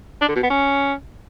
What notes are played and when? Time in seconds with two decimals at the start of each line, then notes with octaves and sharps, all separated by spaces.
0.21 D4
0.28 D3
0.36 B2
0.43 B3
0.50 C#4